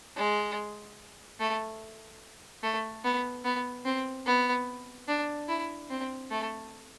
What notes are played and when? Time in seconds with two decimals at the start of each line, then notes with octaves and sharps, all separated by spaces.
0.17 G#3
1.40 A3
2.63 A3
3.04 B3
3.45 B3
3.85 C4
4.26 B3
5.08 D4
5.49 E4
5.90 C4
6.31 A3